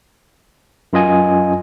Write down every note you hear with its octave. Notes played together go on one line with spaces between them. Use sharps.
F#2 F4 D#5 G#5